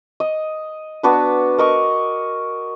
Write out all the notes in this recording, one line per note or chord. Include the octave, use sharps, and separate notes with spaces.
D#5
B3 D4 F#4 B4
A#4 D#5 C#6